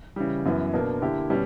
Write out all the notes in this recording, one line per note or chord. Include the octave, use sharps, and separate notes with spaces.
C#3 E3 G3
F#2 E3 B3
B2 A#3 D4
D3 A#3 E4 G4
B2 G3 C#4